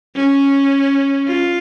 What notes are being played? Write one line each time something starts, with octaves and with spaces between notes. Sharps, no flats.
C#4
F4